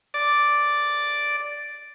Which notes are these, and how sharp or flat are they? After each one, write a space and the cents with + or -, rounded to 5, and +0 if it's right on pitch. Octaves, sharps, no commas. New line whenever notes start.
D5 +0 D6 +0